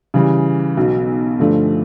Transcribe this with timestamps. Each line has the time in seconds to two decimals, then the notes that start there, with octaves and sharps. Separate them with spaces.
0.14 C#3 E3 G3
0.77 B1 B2 F#3
1.39 G2 D3 F3 A3